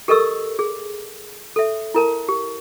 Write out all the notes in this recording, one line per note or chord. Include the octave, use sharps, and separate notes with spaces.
G4 A4 A#4 D#5 C#6 E6
G#4
A4 E5
E4 A#4 A5
G4